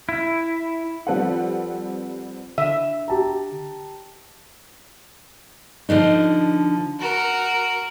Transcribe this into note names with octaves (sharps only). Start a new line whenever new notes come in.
E4
F3 G3 C4 A4 B4 F#5
D3 E5
G4 A5 A#5
D3 F3 D4 D#4
F#4 A#4